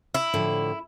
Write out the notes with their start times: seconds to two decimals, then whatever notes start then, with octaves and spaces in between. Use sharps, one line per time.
0.14 E4
0.34 A2 D3 F3